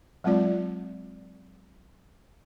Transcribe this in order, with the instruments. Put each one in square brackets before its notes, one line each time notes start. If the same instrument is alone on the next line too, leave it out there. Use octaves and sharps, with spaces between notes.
[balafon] F#3 G#3 C4 F4 D5